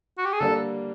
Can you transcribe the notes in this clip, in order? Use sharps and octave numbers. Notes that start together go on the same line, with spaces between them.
F#4
G4
G#4
D3 G3 A#3 D4 A4